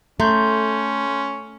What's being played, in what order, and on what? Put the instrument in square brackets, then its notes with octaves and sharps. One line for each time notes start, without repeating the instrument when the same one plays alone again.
[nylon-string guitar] A3 [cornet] C#4 [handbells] A#5 C6 G6